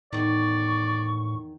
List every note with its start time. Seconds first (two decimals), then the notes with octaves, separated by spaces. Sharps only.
0.13 E2 A2 D#3 D5 C#6